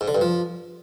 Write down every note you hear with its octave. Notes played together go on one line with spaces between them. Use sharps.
G#2
D3
G2
F3